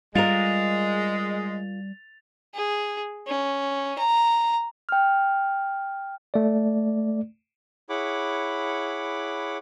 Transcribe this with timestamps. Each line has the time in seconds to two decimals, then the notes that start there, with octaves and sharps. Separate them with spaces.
0.15 G3 G#3 F4 A#4 A6 F7
2.54 G#4
3.27 C#4
3.98 A#5
4.89 G5 F6
6.34 A3 D5
7.89 E4 G#4 C#5 F#5 B5 D6